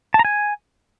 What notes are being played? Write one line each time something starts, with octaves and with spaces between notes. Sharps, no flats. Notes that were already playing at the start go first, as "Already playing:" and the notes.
A5
A#5
G#5